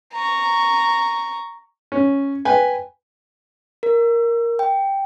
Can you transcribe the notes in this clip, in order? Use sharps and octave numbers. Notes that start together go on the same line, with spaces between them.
A#5 C#6
C#4
B4 G5 G#5
A#4
G5